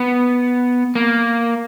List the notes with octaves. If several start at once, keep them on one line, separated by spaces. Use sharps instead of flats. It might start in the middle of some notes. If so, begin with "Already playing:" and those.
Already playing: B3
A#3